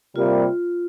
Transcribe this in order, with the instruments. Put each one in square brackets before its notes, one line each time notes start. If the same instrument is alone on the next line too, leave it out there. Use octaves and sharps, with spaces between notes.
[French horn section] C3 G3 A#3 [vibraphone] F4